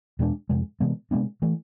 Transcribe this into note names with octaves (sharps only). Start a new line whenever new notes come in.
E2 B2 G#3 D4
F2 C3 G#3
C3 E3 G#3 B3
C3 G#3 B3 D4
E3 A3